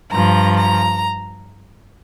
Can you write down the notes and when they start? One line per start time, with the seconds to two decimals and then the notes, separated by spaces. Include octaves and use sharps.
0.12 G2 F3 A#5
0.56 A#5